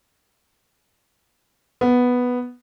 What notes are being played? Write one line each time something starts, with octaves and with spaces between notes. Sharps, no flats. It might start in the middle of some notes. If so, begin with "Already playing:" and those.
B3